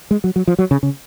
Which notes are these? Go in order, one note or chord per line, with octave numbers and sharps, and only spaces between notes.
G#3
F#3
F#3
F3
F#3
C#3
C#3